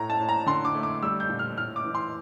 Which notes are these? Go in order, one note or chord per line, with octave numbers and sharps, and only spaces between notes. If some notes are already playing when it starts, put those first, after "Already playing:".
Already playing: A2 A3 A#5
A5
A2
A#5
D3 C6
D6
A3
D6
G3 E6
G6
A#2
F6
A2 F6
D6
E3
C6